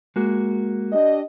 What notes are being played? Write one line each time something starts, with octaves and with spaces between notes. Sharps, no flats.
G#3 A#3 F#4
D4 G4 D#5